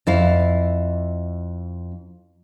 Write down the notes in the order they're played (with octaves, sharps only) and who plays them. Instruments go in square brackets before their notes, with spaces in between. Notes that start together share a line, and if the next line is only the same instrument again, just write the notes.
[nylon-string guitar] F2 E4 F5